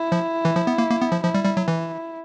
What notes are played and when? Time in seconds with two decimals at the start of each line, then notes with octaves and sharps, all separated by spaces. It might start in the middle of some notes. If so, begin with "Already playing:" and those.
Already playing: E4
0.12 F3
0.45 E3
0.56 F3
0.67 B3
0.78 A#3
0.90 A#3
1.01 B3
1.12 F3
1.23 F3 E4
1.34 G3
1.45 G3
1.57 F#3
1.68 E3